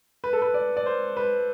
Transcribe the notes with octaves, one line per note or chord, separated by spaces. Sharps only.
B4
A4
B4
D5
D5
C5
B4